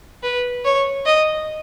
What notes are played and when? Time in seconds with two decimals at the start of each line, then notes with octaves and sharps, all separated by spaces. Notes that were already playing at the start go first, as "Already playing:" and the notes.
0.23 B4
0.65 C#5
1.06 D#5